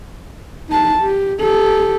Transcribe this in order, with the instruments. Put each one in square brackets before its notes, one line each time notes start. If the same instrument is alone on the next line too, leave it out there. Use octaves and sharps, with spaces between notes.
[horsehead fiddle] D#4 A5
G4
G4 A4